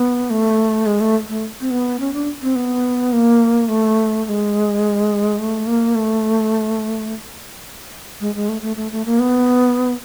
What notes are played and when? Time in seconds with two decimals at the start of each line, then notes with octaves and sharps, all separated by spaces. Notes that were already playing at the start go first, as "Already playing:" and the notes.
Already playing: B3
0.30 A3
0.86 G#3
1.01 A3
1.28 A3
1.61 C4
1.71 B3
2.00 C#4
2.13 D4
2.42 C4
2.55 B3
3.12 A#3
3.69 A3
4.25 A3
4.29 G#3
5.38 A3
5.67 A#3
5.95 A3
8.20 G#3
8.35 G#3
8.49 A3
8.62 A3
8.76 A3
8.92 A3
9.06 A#3
9.19 B3